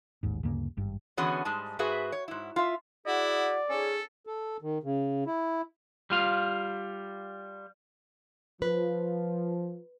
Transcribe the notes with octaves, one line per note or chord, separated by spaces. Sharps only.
A1 D#2 G#2
D2 G2 C#3 A#3
G#1 G2
D3 E3 B3 C#4 F#4 G#4
G#2 G3 G#3 A5
G#2 F#4 G#4 B4 E5
C#5
G#2 E4
F4 E5
E4 F#4 G#4 D5 F#5
C#4 D#4 G#4 A4
A4
D#3
C#3
E4
G3 F4 F5
F3 B4